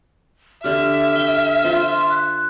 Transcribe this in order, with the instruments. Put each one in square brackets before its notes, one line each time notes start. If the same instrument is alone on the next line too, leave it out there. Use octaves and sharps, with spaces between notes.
[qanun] D3 G4 [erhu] E5 [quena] F6
[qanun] G5
F4 C5
[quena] F#6